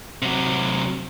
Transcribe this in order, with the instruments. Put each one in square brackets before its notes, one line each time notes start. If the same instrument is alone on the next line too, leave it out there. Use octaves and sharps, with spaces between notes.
[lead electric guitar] C3 F#3